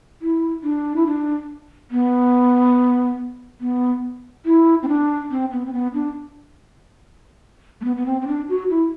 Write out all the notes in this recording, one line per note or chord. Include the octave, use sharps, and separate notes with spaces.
E4
D4
E4
D4
B3
B3
E4
C4
D4
C4
B3
C4
B3
D4
A3
B3
B3
C4
C4
D4
F#4
E4